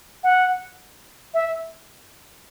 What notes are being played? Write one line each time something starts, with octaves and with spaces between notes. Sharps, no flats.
F#5
E5